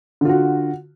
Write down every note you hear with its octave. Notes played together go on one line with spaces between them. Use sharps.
D3 F4 F#4